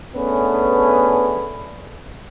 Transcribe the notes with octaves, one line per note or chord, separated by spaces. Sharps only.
A3 B3 C#4 D4 G#4 B4